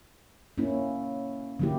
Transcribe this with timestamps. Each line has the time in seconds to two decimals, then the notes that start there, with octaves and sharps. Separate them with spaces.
0.58 A#3 C#4 E4
1.59 D3 F#3 A#3 E4 G4